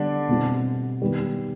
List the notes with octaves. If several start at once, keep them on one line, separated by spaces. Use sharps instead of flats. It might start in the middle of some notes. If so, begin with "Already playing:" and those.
Already playing: D3 G3 B3 D4
B2 G3 C4 G4
D#3 G3 B3